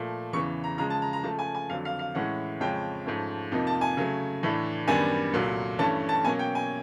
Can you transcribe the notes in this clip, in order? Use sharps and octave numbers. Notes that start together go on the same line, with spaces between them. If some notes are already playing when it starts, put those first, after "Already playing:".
Already playing: A#2 F3 A3
E2 C#3 E3 C#6
A#5
C#3 F3 G#3 A#5
A5
A#5
A#5
C#3 F3 A3 A5
G#5
G#5
F2 D3 F#3 F5
F5
F5
A2 E3 G#3 C#4 F#5
F2 C#3 F3 G#3 C#4 G5
G#2 F3 A3 C#4
F2 C3 F3 A#3 D#4
A5
G#5
C#3 F#3 A3
A2 E3 A3 D4
F#2 D#3 G3 B3 D4 G#5
C2 A#2 F#3 A3
G2 E3 A3 C#4 A5
A5
B2 F#3 A#3 C#4 G#5
G5
G#5